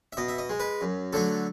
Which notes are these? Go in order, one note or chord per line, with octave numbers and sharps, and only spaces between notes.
E5
B2 D#5
E5
D#5
G#3
B4
F#2
D3 F#3 A3 A4